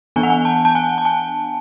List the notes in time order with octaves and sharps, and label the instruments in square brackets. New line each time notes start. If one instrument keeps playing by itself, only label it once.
[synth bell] E3 B3 D4 G#5
F#5
G#5
A5
A5
G#5
A5
G#5